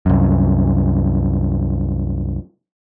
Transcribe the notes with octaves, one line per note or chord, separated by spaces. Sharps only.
C2 F#2